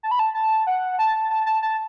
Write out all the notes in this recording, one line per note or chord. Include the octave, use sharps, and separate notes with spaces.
A5
B5
A5
A5
F#5
A5
A5
A5
A5